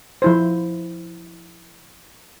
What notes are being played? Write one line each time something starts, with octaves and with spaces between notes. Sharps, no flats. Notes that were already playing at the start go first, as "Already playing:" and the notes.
F3 E4 C5